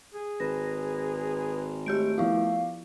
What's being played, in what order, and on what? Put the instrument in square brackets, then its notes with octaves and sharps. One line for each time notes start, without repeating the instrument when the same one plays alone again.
[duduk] G#4
[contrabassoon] G#1 [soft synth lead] B4 [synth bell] A#6
[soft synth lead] G#3 [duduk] A3 [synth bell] G4 G6 D7
[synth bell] F3 E4 F4 [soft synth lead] F5